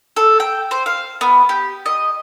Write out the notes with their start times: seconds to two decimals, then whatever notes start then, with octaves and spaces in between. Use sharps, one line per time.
0.16 A4
0.40 G5
0.71 C5
0.86 F5
1.21 B3
1.49 G4
1.86 D#5